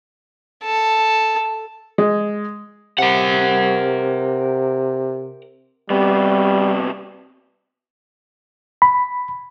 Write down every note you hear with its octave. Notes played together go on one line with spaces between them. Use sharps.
A4
G#3
C3 A#4 F#5
C3 G3 B3
B5